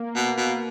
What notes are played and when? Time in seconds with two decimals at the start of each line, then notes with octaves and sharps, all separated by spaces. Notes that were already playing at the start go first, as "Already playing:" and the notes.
Already playing: A#3
0.15 B2
0.37 B2